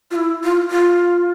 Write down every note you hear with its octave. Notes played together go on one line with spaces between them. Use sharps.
F4
E4
F4
F4